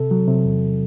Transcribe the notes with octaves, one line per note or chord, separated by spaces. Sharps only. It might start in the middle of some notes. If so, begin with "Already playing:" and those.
Already playing: C3 A4
F#3
C3
E2